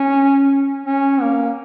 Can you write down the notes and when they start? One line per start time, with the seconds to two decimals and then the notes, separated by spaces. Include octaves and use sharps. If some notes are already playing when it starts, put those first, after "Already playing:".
Already playing: C#4
0.86 C#4
1.21 A#3